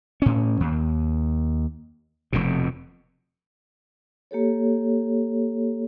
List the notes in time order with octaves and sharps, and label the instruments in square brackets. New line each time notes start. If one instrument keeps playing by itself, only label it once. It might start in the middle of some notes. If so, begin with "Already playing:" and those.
[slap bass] A2 C#4
D#2
F1 F2 B2
[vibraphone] A#3 G4 A4 C#5